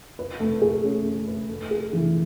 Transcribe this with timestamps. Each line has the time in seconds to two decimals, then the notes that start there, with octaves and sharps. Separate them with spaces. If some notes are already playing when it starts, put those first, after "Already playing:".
0.19 B4
0.40 A3
0.62 G#4
0.84 C#4
1.05 A3
1.27 B4
1.49 A3
1.71 G#4
1.93 E3